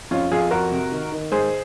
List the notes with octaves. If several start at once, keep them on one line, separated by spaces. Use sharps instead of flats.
F2 C#4 F4
F2 F4 G#4
F2 F#4 A#4
C3
D#3
D#3
G#2 G#4 C5